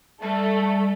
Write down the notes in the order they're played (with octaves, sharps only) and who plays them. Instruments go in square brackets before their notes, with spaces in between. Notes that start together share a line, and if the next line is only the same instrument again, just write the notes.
[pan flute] G3 [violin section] A3 A4